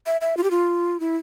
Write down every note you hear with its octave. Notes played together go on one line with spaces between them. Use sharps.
E5
E5
F4
G4
F4
E4